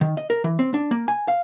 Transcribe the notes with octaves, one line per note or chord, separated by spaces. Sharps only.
D#3
D#5
A#4
E3
C4
D4
A#3
G#5
F5